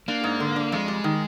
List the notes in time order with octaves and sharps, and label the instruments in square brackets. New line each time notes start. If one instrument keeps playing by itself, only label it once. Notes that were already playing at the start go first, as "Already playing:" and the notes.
[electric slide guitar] A#3 [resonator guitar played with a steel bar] D4
[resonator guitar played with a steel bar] G#2
D3
D4
[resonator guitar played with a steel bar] F2 [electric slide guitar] G#3
[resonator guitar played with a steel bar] G3
D#3